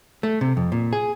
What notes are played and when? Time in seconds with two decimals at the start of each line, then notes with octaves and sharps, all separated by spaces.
0.23 A3
0.41 C3
0.57 F2
0.72 A#2
0.93 G#4